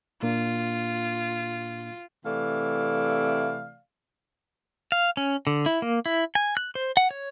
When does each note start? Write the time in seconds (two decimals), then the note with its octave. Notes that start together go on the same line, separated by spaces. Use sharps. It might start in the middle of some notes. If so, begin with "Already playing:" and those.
0.23 A#2 A#3 D4 F4
2.25 C3 E3 A3 D5 F5
4.92 F5
5.17 C#4
5.47 D3
5.66 E4
5.82 A#3
6.06 E4
6.35 G#5
6.57 F#6
6.75 C5
6.97 F#5
7.11 C#5